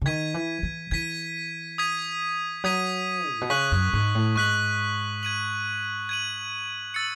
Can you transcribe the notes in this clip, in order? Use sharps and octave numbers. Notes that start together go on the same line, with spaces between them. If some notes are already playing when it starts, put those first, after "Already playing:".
C#3
D#3 G#6 B6 D#7
E3
E3
E3 G#6 B6 D#7
D#6 G#6 B6 D#7
F#3 D#6 G#6 B6 D#7
A2
B2
C#3 C#6 F#6 B6 F#7
F#2
G#2
A2
G#2 C#6 F#6 B6 F#7
G#6 D#7 F#7
G#6 D#7 F#7
E6 A6 C#7